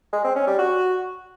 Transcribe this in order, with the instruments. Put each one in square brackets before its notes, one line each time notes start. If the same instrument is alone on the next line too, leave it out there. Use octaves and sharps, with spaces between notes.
[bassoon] G#3
C4
C#4
G3
F#4